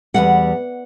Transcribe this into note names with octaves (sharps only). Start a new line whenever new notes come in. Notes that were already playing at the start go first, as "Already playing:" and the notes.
E2 C#3 G3 F#5